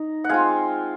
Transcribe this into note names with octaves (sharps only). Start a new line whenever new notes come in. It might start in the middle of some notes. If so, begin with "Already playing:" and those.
Already playing: D#4 A#5
F#5
G#3 C4 F4 F5 G#5